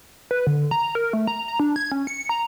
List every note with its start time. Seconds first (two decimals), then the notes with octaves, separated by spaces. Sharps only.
0.31 B4
0.47 D3
0.71 A#5
0.95 A#4
1.13 A3
1.27 A#5
1.48 A#5
1.60 D4
1.76 G#6
1.92 C#4
2.07 C#7
2.29 A#5